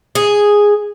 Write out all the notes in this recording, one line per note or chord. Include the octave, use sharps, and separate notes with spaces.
G#4